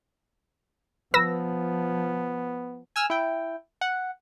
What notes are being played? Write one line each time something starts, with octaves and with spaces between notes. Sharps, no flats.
F3 B3 B4 E6 A#6
G#5 E6 F6
E4 G5
F#5